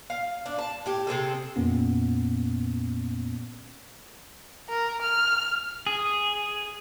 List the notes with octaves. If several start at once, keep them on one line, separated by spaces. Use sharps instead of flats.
F5
D4
A5
A2 G4
C3 C4 G#4 A4
F2 A#2 A#3 B3 C#4
A#4
F6
G#4